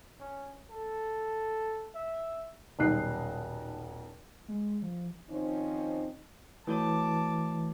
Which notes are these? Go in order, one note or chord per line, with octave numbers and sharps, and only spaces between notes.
C#4
A4
E5
D#1 B1 D#4 F#6 C7
G#3
F3
D#3 F3 C4 C#4 D#4
E3 A3 F#4 C#5 A5 D6